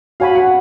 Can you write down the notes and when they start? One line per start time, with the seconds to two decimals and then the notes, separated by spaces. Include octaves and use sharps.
0.20 F#4 C#5 F5 G#5 B5
0.35 F#5